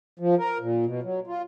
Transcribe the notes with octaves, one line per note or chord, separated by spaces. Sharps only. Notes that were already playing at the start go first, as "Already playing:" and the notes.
F3
A#4
A#2
B2
F#3
F4